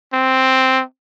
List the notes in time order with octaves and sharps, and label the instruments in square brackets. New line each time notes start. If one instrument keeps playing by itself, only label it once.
[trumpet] C4